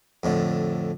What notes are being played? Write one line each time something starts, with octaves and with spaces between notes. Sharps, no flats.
F2 A2 D3